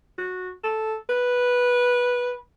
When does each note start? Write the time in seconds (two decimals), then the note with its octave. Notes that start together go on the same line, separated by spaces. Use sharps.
0.18 F#4
0.64 A4
1.09 B4